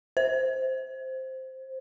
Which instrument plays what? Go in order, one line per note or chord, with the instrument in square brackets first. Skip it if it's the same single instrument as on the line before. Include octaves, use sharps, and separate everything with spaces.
[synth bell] C5